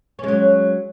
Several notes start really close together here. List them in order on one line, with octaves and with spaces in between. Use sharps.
C#4 G#3 F#3